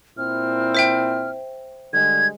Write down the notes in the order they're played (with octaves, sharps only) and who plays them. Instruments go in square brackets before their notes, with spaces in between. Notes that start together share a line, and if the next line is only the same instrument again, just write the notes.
[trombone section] A#2 C4 E4 [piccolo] F6
[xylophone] C5 E5 G5
[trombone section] D3 G3 G#3 [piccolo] G#6